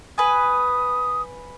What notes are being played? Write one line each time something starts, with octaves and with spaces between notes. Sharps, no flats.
B4 G#5 D#6